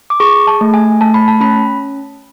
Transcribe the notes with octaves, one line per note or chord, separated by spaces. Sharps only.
D6
G#4 C#6
A5
A3
G#5
A3 A5
B5
A5
C#4 B5